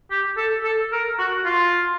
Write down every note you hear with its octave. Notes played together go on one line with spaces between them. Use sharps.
G4
A4
A4
A#4
F#4
F4